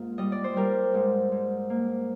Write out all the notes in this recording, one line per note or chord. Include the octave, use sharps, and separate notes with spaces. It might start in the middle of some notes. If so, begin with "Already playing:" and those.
Already playing: G#2 A#3 F4
G3 D#5
D5
C5
G3 G4 A#4
G#2
G#2
A#3